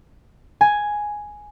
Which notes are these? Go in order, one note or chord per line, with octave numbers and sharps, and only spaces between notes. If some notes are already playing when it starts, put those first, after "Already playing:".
G#5